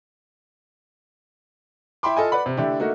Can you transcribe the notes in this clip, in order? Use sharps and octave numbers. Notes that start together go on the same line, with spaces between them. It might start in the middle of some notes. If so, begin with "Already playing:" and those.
E4 E5 G5 B5 C6 D6
F4 A4 D#5 G#5
B4 D5 F#5 B5
C3
D3 A3 D4 E4 G4
A3 A#3 D#4 F#4